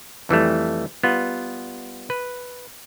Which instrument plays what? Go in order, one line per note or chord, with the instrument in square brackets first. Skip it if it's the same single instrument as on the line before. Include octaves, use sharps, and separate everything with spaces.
[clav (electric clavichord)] F2 E3 G3 A3
G3 B3 F4
B4